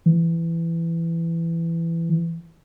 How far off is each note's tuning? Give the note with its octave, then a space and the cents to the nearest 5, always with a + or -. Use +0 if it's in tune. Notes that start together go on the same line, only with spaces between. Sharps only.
E3 +15